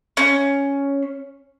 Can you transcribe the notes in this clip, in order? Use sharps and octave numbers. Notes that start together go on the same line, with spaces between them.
C#4